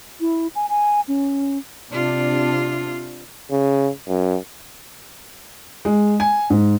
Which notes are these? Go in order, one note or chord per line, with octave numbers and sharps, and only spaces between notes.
E4
G#5
G#5
C#4
C3 D4 F4
C#3
F#2
G#3
G#5
G#2